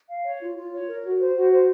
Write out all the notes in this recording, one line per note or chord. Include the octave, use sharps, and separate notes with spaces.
F5
C#5
F4
F4
C#5
A#4
F#4
C5
F#4
C5